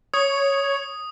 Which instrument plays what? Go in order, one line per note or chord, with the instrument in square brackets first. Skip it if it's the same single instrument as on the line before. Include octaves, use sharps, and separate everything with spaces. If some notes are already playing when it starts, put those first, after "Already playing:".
[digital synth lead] C#5 [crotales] D#6